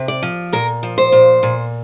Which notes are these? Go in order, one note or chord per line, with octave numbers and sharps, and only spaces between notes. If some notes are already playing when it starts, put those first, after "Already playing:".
Already playing: C3
D5
F3
A#2 A#4
F3
C5
A#2
A#2